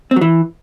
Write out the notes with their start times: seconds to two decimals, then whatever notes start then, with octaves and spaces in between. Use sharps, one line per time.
0.11 C4
0.16 F#3
0.21 E3